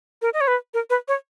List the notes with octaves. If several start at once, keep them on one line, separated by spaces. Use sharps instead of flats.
A#4
D#5
C#5
B4
A#4
B4
C#5